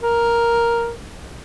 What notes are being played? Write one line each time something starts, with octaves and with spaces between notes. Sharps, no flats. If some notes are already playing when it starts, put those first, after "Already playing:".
A#4